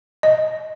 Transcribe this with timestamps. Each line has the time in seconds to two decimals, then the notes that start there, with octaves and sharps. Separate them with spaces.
0.23 D#5